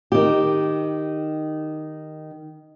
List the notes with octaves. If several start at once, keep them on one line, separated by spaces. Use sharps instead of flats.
D#3 G4